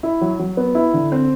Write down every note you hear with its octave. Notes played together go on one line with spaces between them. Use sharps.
E4
F#3
F#3
B3
E4
D3
C4